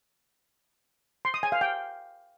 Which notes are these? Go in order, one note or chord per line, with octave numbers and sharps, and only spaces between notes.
C6
D#6
G#5
F5
G5